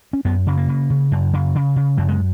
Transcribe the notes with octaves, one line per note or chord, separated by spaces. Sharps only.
C#4
F#2 B3
C#3
A#3
C#3
C#3
F#2
C#3
C#3
C#3
F#2 F#3
G#3